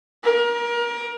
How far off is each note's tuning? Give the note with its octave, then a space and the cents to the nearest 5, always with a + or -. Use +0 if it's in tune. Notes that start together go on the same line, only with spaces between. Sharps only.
A#4 +30